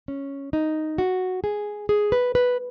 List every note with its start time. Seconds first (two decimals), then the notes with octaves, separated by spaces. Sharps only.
0.08 C#4
0.53 D#4
0.98 F#4
1.44 G#4
1.89 G#4
2.12 B4
2.35 B4